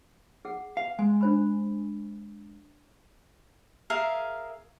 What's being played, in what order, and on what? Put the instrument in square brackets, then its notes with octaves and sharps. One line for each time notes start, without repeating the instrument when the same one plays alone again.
[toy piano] G#4 F#5
[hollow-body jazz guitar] F5
[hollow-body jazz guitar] G#3 [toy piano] G#5
[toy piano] D4 C5 B5
[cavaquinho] G#4 A#4 E5 F5